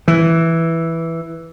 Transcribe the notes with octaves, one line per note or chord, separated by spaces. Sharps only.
E3